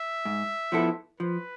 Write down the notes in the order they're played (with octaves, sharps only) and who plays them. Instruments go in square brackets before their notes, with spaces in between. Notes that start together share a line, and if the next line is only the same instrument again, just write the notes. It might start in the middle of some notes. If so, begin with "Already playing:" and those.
Already playing: [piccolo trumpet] E5
[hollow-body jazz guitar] G#2
F3 B3 E4 A4
[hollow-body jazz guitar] F3 [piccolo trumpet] B4